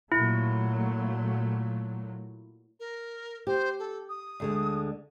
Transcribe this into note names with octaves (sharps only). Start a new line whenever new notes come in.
A#2 F#3 A3 E4
A#4
G4 C5
A4
D#6
D2 D3 G#3